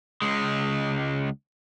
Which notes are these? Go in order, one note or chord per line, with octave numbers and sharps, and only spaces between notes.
C#2 G#3